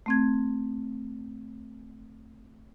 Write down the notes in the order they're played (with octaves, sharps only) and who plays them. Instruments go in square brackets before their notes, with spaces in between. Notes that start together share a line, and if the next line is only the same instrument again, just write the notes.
[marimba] A3 C4 G#6